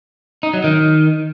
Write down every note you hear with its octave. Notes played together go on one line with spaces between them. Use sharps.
D#4
F#3
D#3